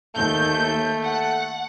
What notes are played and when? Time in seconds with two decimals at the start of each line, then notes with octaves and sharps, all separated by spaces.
0.15 D#2 A3 G6
1.04 F#5